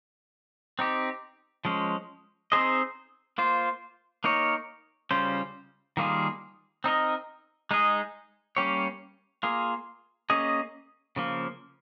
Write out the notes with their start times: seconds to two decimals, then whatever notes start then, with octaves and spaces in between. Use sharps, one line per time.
0.79 C4 D#4 G4
1.65 F3 G#3 C#4
2.52 C4 D#4 G#4 C5 D#5
3.38 A#3 F4 C5
4.24 A#3 D#4 A#4 C#5
5.11 C#3 G3 C#4 F4 C5
5.97 D#3 G3 A#3 F4 G#4
6.84 C4 D#4 A#4 D#5
7.71 G#3 D#4 G#4 D#5
8.57 G3 A#3 C#4 G4 C#5
9.43 A#3 F4 G#4
10.30 A#3 C#4 G#4 D#5
11.16 C#3 F3 A#3